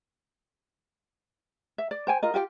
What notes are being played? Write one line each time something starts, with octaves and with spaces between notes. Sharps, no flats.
E5
D5
C5 G5 G#5
F4 A#4 D#5
F4 G4 D#5 G5